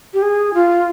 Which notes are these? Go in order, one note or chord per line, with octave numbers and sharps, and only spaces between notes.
G4
G#4
F4